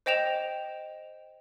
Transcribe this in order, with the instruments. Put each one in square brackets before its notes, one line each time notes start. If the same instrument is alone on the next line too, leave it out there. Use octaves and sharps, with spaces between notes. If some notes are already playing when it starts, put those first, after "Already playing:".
[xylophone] C5 D#5 G5 E7 F7